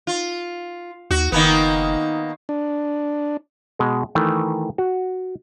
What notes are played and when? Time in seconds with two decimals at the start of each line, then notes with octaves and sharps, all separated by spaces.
0.07 F4
1.11 D#2 F#4
1.32 F#1 D#3 A#3 B3
2.49 D4
3.79 B2 G#3
4.15 D#3 E3 A3
4.78 F#4